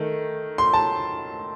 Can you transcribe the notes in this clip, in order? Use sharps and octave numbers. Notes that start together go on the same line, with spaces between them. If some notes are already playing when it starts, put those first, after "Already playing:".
Already playing: D#3 A3
C6
A5